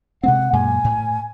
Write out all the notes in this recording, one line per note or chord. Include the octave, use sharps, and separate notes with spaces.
C3 G#3 C4 F#5
F#2 A#2 G#3 G#5
A2